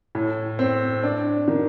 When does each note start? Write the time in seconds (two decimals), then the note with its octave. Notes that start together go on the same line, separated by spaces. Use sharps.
0.15 A2
0.59 C4
1.03 D4
1.48 D#3